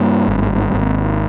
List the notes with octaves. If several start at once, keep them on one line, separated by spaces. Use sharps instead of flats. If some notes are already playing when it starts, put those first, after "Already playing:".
Already playing: G2 A#3
G#1
G#1